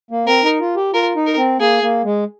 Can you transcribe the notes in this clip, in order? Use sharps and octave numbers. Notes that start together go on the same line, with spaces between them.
A#3
C4 A#4
D#4
F4
G4
F4 A#4
D#4
A#4
C4
A#3 G#4
A#3
G#3